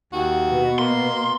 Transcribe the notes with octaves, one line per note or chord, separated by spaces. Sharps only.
D#2 F#4
B2
A#3 C6